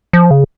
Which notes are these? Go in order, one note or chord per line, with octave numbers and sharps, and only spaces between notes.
F3
C#3